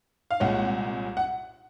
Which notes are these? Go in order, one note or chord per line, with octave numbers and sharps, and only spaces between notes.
F5
C2 A#2 G#3 C#4 F#5
F#5